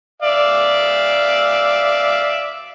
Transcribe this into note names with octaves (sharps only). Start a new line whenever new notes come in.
D5 E5 F5